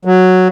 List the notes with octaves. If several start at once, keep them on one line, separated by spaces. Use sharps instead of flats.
F#3